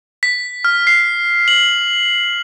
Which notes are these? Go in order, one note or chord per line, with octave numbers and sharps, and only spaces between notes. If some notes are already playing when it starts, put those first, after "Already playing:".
B6
F6
C7
F#7